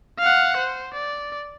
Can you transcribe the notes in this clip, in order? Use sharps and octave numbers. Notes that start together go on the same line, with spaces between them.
F5 F#5
C5
D5